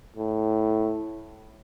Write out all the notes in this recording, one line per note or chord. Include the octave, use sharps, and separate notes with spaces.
A2